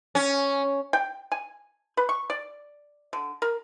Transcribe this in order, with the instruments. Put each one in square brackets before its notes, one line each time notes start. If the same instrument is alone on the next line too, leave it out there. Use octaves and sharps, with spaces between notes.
[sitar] C#4
[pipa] G5
G#5
B4
C#6
D5
D3
A#4